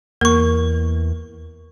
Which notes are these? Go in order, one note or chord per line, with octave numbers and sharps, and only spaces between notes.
E2 A#3 A#4 C#6